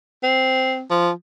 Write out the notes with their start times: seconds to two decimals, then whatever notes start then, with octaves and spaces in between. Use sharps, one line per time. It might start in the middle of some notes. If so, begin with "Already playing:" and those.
0.23 C4
0.90 F3